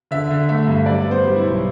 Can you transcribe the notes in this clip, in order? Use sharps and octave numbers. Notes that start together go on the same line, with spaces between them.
D3 E5
D3
A3 E5
G2
G3 D5
B3
C5
G3
E4
B1